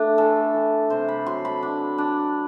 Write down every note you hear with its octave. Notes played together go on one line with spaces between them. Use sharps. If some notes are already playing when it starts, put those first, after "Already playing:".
Already playing: A3 D4
E3 A4
E3
C3 C5
B5
F#3 C6
B5
D4
D4